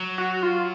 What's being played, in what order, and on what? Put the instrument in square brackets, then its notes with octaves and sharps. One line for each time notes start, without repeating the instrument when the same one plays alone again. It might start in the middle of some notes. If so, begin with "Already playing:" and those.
Already playing: [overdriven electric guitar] F#3
[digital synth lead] F#4
F4